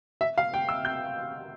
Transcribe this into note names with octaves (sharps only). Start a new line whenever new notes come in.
E5
F5
G5
E6
G6